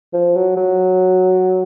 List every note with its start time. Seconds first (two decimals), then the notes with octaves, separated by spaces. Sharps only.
0.13 F3
0.36 F#3
0.57 F#3